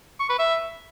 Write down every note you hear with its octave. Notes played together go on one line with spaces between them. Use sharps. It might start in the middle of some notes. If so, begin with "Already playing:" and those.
C#6
B4
E5